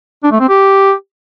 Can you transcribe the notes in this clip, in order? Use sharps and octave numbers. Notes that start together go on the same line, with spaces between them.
D4
A3
C4
G4